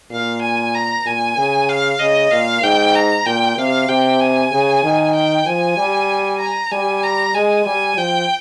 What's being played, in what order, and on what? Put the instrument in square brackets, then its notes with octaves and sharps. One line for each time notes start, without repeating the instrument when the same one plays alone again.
[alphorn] A#2 [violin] F5
[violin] G#5
A#5
[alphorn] A#2 [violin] G#5
[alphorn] C#3
[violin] F5
[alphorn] C#3 [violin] D#5
[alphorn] A#2 [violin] F5
[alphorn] G#2 [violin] G5
[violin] A#5
[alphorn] A#2 [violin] G5
[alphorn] C3 [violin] F5
[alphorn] C3 [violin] G5
[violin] G#5
[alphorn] C#3
D#3
[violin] G5
[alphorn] F3 [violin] G#5
[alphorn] G3
[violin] A#5
[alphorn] G3 [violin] G#5
[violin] A#5
[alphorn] G#3 [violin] G#5
[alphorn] G3 [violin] G#5
[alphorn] F3 [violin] G5